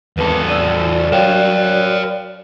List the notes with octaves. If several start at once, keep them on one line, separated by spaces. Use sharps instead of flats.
G#1 E2 A4 B4
F1 D5 E6 D#7
E3
F#3 A#4 C#5 F5 G5 E7